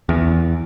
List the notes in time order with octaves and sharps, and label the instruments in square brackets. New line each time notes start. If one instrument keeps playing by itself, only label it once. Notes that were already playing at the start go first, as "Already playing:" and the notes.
[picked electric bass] E2